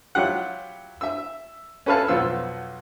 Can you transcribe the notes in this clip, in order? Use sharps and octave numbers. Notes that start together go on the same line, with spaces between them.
F#3 E4 F4 G4 F#5
E5 E6
C#4 A4 B4 E5 F5 A5
B1 F2 B3 F4 E6